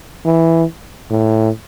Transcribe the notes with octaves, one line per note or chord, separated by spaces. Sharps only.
E3
A2